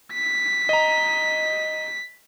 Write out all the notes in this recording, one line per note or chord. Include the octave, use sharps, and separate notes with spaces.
B6
D#5 A#5